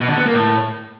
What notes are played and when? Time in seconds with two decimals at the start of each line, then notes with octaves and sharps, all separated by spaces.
0.01 B2
0.09 D3
0.18 B3
0.26 A#3
0.34 A2